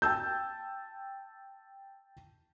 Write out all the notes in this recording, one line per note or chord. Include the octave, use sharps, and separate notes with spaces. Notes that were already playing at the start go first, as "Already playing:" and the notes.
G5 A5 E6 G6